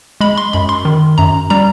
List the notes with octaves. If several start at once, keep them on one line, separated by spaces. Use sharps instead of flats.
G#3 B5
C6
F#2 B5
C6
D#3
F#2 A#5
G3 A#5